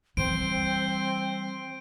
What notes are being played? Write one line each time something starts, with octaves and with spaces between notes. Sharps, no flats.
E3 G3 C4 C5 D7